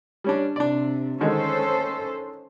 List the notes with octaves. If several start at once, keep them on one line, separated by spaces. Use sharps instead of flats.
G3 C#4 D4
C3 D4 D5
D3 D#3 G#3 C#4 A4 C5